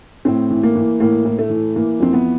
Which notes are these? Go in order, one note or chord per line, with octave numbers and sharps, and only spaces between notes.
A2 C4
E3
A#3
E3
A2 A#3
A2
A3
E3
E3 A#3
F2 C4
B3